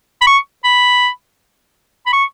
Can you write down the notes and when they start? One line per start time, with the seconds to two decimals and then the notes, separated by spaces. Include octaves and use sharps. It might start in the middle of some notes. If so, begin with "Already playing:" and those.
0.21 B5
0.27 C#6
0.64 B5
2.06 B5
2.13 C#6